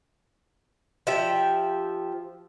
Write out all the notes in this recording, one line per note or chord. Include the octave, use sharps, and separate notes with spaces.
F3 G4 E5 G5